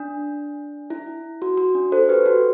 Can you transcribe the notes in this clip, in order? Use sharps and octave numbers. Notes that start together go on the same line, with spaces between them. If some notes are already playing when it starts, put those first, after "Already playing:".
Already playing: D4
E4
F#4
F#4
D4
A4 C5
G4 B4
F#4 A4